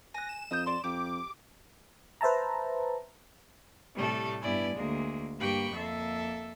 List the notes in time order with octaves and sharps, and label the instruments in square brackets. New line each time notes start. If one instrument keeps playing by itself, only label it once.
[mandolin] G#5 F#6 [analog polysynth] A#6
[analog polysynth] E7
[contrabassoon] F2 [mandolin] D#5 D#6 G6
[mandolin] D5 C6
[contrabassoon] F2 [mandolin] G4 [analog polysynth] D6
[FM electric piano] B4 C5 E5 A5 A#5
[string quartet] A2 C3 G3 A3 A4
G2 B3 E4 D5 G#5
D2 G#3 A#3
G2 A#3 G4 G5 B5 C#6
F2 A#3 A4 E5